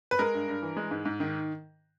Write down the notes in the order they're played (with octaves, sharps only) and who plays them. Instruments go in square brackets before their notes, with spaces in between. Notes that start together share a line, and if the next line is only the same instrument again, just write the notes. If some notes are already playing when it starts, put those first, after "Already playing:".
[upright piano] B4
G#3 A#4
G2
G2
E3
G#3
G#2
G#2
D#3